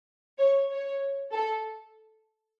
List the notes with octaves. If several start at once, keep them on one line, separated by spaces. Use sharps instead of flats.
C#5
C#5
A4